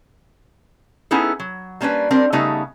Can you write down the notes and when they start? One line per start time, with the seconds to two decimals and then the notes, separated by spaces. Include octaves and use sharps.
1.11 B3 C#4 D#4 E4 G#4 A4
1.40 F#3
1.81 G3 A#3 C#4 D4 B4
2.10 G3 C4 D4 A#4
2.33 C#3 G3 A3 B3 D#4 A4